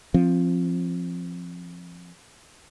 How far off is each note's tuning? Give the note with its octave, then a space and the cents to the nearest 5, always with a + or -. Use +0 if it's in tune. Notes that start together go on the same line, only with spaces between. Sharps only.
F3 -5 C4 +20